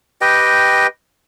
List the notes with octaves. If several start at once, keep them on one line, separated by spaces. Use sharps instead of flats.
G4 B4 D#5 G5